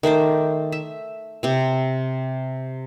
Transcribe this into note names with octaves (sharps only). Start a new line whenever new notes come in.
D#3 A3 C5 D6
E5
C3 C4